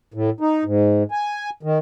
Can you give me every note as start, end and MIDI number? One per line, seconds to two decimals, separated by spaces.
0.14 0.30 45
0.40 0.64 63
0.64 1.03 44
1.11 1.50 80
1.63 1.78 51